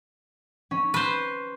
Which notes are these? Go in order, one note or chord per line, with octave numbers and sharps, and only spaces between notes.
C#4
B4 C5